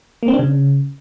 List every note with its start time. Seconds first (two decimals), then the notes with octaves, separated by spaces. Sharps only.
0.23 A#3
0.28 C4
0.34 D4
0.39 C#3